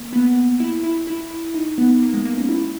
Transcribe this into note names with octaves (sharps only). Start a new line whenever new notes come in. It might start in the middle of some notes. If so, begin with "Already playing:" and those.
Already playing: A#3
B3
E4
E4
E4
E4
D#4
B3
A#3
G#3
A#3
C#4
E4